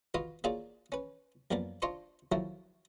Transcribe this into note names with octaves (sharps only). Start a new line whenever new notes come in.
F4 F#4 B4 D#5 F5 B5
A#3 F4 F#4 G#4 C#5 D5
C#4 B4
F#2 F3 A#3 B3 D5
D4 F4 C5 D#5 C6 C#6
D#3 F3 F#3 A3 E4 F#4